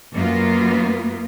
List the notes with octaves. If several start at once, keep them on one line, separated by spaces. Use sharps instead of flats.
F#2 A#3 B3 F4